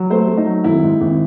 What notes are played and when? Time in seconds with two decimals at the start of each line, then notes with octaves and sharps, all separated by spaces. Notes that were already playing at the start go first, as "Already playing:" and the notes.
Already playing: F#3
0.10 A3 C5
0.28 A3
0.37 D#4
0.46 F#3
0.64 G#1 E4
0.83 G#2
1.01 G#1